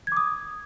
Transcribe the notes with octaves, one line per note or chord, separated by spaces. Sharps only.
D6 D#6 G#6